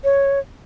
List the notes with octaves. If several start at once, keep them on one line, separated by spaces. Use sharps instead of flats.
C#5